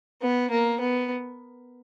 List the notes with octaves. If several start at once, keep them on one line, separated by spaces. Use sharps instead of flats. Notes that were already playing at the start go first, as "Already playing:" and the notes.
B3
A#3
B3